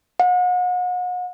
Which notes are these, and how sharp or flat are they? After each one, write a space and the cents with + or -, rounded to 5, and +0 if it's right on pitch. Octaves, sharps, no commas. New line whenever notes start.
F#5 -40